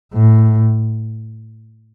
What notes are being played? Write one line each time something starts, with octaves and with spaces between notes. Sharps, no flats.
A2